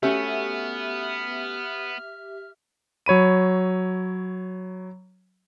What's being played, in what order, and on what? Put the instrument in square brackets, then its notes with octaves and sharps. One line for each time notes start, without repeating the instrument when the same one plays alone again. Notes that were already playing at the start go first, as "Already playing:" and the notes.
[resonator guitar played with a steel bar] A3 C#4 F#4 [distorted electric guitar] B3 [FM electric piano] G4 E5 [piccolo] F6
[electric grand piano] F#3 C#5 B5 D#7